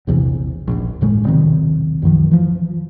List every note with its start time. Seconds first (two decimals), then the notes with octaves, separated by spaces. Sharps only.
0.07 A#1 E2 C3 E3
0.67 D#1 A#1
1.01 G1 A2 C#3 G#3
1.24 D#1 B1 C3 D#3
2.02 C2 F#2 D#3 F3
2.31 E3 F3